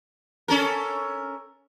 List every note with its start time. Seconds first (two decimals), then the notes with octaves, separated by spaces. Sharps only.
0.48 C#4 A4 A#4